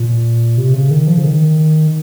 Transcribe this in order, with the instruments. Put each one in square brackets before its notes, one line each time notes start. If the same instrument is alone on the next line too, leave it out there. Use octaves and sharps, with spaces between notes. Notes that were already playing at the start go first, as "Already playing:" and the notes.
Already playing: [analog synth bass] A#2
C3
C#3
D#3
F3
C#3
D#3